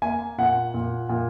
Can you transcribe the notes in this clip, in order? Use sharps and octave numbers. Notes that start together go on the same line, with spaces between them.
A#3 G#5
A#2 F#5
A#2
A#2